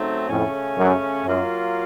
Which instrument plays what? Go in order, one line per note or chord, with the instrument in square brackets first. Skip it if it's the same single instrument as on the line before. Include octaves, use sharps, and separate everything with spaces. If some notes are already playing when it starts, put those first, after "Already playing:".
Already playing: [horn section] C#3 F#3 A3 C4 D#4
[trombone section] F2 A2 [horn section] C#3 A3 C#4
[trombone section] F#2
[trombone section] F#2 [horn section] F#3 A#3 F4